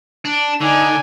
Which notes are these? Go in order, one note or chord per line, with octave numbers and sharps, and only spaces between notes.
D4
D3 D#4 D5 G#5